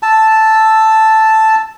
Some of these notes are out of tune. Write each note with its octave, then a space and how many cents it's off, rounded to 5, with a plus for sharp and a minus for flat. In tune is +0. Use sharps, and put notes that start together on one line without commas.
A5 +0 E6 +0